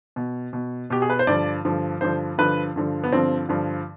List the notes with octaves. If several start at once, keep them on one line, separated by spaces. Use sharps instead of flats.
B2
B2
B2 G4
G#4
B4
C5
G2 D3 F3 D5
G2 D3 F3
G2 D3 F3 C5
G2 D3 F3 B4
G2 D3 F3
B3
G2 D3 F3 C4
G2 D3 F3